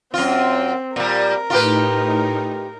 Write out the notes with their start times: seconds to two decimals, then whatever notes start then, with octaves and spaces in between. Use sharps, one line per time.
0.14 F#2 C4 F4
0.96 A#2 G3 A#4
1.50 A2 D#4 F4 G4 B4